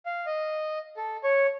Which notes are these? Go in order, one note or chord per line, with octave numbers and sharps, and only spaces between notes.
F5
D#5
A4
C#5